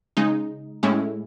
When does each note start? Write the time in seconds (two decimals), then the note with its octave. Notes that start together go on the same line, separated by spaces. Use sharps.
0.17 C#3 G#3 D#4
0.83 A2 G#3 C#4 E4